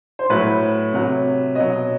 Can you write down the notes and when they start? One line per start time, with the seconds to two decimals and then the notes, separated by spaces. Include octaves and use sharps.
0.19 C5
0.30 A2 F#3 B4
0.93 C3 F#3
1.55 B2 F#3 D#5